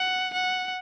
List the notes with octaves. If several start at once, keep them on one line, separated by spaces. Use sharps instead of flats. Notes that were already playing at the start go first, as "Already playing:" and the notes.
Already playing: F#5
F#5